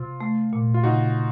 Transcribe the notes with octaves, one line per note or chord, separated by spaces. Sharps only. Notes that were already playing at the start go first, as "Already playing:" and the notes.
Already playing: C3 F4
A3
A#2
F4
C#3 D#4 F#4